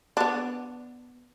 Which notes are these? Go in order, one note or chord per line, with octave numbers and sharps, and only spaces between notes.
B3 D4